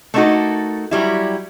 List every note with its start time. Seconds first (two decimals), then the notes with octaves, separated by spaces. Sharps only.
0.14 A3 A#3 D4 D#4 F#4 A4
0.91 F#3 G3 E4